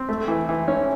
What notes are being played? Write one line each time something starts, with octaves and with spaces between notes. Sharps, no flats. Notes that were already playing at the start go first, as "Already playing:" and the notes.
Already playing: C4
A3
E3
E3
C#4